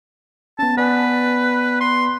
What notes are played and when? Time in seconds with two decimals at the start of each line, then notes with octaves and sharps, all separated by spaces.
0.59 B3 C#4 A5
0.77 B3 B4 D5 G#5
1.80 C6